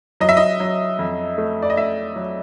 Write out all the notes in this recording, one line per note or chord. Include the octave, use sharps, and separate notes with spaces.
F#3 D#5
E5
D#5
F#3
F2
A3
D5
D#5
A3 E5
F#3